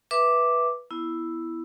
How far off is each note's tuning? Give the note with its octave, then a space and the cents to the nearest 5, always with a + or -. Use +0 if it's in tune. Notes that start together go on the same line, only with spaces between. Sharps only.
B4 -10 E5 +0 D6 +0
B3 -5 E4 +0